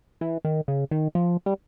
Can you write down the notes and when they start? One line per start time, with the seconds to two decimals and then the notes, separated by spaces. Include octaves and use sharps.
0.21 E3
0.45 D#3
0.68 C#3
0.91 D#3
1.15 F3
1.46 G3